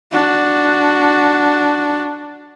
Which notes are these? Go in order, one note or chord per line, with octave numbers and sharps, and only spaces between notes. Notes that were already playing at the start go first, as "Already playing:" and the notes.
D4 F#4